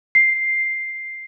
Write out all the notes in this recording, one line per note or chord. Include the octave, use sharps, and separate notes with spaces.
C7